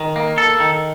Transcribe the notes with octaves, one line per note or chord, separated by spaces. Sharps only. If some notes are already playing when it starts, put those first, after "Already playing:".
Already playing: D#3
A#3
A4
D#3